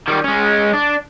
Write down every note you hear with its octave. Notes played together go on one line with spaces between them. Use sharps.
D#3 G3
G#3 C#4
D4